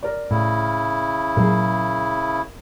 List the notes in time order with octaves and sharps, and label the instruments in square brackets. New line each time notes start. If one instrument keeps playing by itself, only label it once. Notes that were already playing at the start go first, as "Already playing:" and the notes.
[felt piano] A#4 D5
[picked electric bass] A2 [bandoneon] C#3 E4
[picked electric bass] A#2 F#3 [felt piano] A#3 G#4